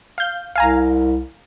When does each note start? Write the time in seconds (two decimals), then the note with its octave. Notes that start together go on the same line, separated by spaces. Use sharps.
0.18 F5 G6
0.56 C2 F5 G#5 A#5